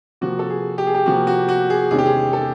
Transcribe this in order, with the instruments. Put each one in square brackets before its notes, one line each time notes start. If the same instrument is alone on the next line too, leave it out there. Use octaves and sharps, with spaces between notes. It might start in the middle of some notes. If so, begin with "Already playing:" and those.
[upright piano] C3 F3 A#3 F#4
A4
G#4
G4
G#4
G4
C3 F3 A#3 F#4
F#4
F#4
G#4
E2 C3 D#3 G#3 C#4 G#4
G4
G#4
A4